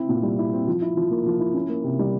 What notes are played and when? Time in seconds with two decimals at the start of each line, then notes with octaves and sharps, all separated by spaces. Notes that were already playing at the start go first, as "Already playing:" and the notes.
Already playing: C4 E4
0.09 A#2
0.23 G3
0.38 E4
0.53 C4
0.67 F3
0.82 E4
0.97 F3
1.11 A#3
1.26 F3
1.40 E4
1.54 C#4
1.69 A#3
1.84 C3
1.99 G3